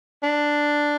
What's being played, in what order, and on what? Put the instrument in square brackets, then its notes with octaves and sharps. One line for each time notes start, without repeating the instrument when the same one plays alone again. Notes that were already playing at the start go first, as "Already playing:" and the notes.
[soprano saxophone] D4